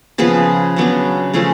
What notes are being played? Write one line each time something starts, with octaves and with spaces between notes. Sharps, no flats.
C#3 F3 B3 G#4 B4
C#3 F#3 B3 D4
C#3 F3 A3 C#4